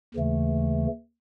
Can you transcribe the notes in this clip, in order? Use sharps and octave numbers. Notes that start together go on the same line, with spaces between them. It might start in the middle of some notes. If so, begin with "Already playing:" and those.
D#2 C#3 E3 A3